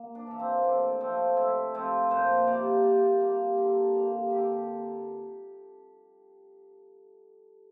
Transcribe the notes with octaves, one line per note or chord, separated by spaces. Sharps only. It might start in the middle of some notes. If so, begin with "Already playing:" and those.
Already playing: A#3
D4
E3 A#3
C4
A2 D4
F3 A3 C4
A2 E4
F3 A3 C4
A#2 C5
G3 A#3 D5
A#2
G3 A#3
D3
G3 A#3
D3 G4